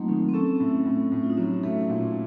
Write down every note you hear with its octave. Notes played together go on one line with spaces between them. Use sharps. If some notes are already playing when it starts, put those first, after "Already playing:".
Already playing: F3 F#3 A3 A#3 C4 D#4
D#3
C4
C#4 A4
A2
A2
A2
F4
D#4
F#3 C#4
A3
A#2